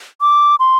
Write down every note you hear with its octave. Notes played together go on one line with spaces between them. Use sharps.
D6
C6